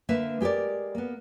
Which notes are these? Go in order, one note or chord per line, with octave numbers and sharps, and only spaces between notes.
D3 A#3 B4 E5
G#3 G4 A4 A#4 D5
A#3 B3